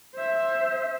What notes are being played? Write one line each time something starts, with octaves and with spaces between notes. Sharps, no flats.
C5 E5